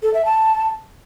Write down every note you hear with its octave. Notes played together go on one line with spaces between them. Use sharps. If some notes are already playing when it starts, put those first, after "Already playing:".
A4
E5
A5